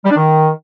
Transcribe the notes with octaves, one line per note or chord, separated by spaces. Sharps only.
G3
D4
D#3